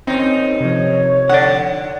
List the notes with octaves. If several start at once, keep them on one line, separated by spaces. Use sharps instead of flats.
D#2 C4 C#4 D#4
C3 F3 C#5
D3 D5 F#5